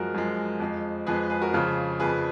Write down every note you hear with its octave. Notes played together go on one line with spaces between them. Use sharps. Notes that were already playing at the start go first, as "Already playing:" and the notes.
Already playing: F#2 F3 G#3 F#4 A#4
F#2 F3 G#3
F2 F3 G#3
F2 F3 G#3 G#4 B4
G#4 B4
F#4 A#4
F2 C#3 F3 F4 G#4
F2 C#3 F3 G#4 B4